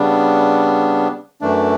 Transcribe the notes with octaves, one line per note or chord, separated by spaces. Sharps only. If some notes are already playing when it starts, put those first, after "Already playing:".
Already playing: C#3 G3 B3 D4
F#2 E3 A3 D4